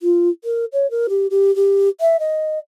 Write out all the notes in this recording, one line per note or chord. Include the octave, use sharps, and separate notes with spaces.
F4
A#4
C#5
A#4
G4
G4
G4
E5
D#5